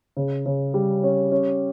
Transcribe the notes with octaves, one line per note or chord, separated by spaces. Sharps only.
C#3
C#3
G3
C#4
C#4